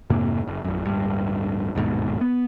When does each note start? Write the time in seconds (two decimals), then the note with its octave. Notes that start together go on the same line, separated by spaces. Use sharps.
0.10 F2 G#2 C3 A#3
0.48 F#1
0.64 A#1 F#2
0.85 D1 G2
1.75 G1 D#2 G#2 B2
2.21 B3